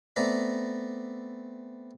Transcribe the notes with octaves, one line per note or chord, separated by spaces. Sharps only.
A3 B3 C4 D5 A#5 B5